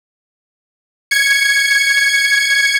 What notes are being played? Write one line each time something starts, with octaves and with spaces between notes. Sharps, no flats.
G#6 C#7